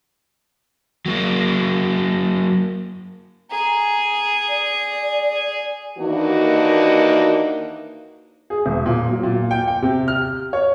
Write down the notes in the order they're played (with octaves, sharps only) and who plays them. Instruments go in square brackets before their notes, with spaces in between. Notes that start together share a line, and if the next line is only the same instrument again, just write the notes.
[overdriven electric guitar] F#3 A#3
[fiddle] G#4 [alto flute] A#5
[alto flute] D5
[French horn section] D#2 E3 A#3 D4 D#4 F#4
[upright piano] G#4
E1
A#2
F#3
A#2
G5
G5
C3
F6
C#5